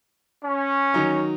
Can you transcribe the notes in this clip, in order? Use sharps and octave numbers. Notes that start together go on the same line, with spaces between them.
C#4
D#3 F#3 D#4